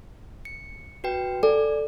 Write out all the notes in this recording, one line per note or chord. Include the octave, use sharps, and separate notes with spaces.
C#7
F#4 B4 G5
A4 D5 G#5